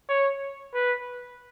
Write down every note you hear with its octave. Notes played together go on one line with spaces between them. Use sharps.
C#5
B4